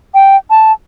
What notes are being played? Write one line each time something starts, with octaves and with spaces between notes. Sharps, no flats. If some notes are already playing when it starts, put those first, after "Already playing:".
G5
A5